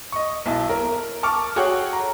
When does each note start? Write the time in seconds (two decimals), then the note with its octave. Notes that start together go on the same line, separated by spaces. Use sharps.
0.12 D#5 C#6
0.46 B1 E4 A5
0.69 A#4
1.23 A5 C#6 D6 F6
1.56 F#4 G#4 A4 C#5 F#5 G5
1.93 A#5